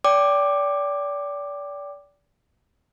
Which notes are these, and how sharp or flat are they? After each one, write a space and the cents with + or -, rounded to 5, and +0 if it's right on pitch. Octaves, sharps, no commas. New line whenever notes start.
D5 -30 G5 +0 D6 +10